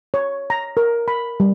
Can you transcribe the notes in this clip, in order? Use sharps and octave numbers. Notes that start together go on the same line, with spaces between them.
C#5
A#5
A#4
B5
G3